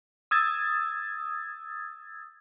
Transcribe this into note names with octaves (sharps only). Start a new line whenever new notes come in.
D#6 E6 G#6 A6